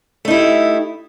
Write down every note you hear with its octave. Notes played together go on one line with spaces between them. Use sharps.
A3 D#4 E4 G4